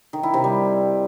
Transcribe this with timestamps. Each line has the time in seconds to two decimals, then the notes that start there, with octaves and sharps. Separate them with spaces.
0.13 D#3
0.23 E4
0.34 C3
0.44 G3